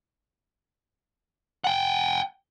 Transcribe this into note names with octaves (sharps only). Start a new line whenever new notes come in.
F#5 G5